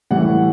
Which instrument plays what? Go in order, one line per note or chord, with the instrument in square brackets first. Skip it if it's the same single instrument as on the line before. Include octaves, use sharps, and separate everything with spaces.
[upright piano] A2 E3 G3 F#5